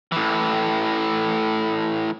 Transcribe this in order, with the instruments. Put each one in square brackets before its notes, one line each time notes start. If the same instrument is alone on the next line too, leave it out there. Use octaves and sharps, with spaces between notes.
[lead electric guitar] A2 E3